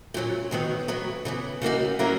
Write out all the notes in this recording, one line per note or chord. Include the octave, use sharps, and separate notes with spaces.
A#2 F#3 C#4
D#2 D#3 F#3 B3
F#3 B3 F#4 C#5
C#3 E3 B3
C#3 E3 A#3 D#4 F#4
F#3 A#3 C#4 E4 A#4